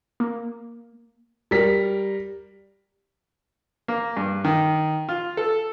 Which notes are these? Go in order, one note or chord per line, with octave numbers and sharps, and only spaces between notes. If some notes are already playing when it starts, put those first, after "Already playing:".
A#3
G3 A#4 B6
A#3
G2
D#3
F4
A4